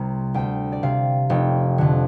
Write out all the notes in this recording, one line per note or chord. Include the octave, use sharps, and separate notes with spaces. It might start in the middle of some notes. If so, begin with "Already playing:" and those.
Already playing: C2 C3 A#5
D2 G5
D5
C3 F5
F1 G5
F2 D3